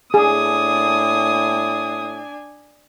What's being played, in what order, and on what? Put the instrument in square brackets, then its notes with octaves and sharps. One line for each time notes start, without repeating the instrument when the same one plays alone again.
[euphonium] A2 [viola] D4 G#5 [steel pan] G#4 [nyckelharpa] D#6